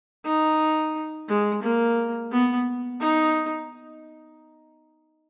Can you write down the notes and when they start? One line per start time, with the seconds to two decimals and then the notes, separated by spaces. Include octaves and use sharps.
0.26 D#4
1.29 G#3
1.63 A#3
2.32 B3
3.00 D#4